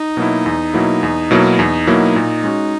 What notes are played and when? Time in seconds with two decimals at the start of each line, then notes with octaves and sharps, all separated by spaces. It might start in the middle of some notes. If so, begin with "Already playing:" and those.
Already playing: D#4
0.17 B2 F#3 A#3 E4
0.46 E2
0.74 B2 F#3 A#3 E4
1.03 E2
1.31 B2 F#3 A#3 E4
1.59 E2 D#4
1.87 B2 F#3 A#3 E4
2.16 A#2
2.43 G#3 C#4 F#4